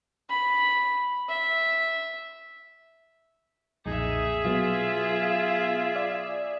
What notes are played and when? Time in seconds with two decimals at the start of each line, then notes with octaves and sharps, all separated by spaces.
0.29 B5
1.29 E5
3.86 B1 F2 A#2 D#4 G#4 E5
4.45 B2 F#3 B3 F4
5.96 D5